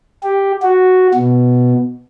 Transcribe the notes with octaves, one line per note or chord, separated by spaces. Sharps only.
G4
F#4
B2